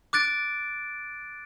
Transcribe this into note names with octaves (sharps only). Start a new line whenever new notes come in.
D6 F#6 A6 D7